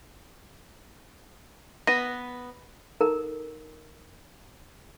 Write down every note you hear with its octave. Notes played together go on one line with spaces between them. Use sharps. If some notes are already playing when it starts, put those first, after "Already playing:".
B3 B4 A#6 D#7
D#4 A4 A#4 A#5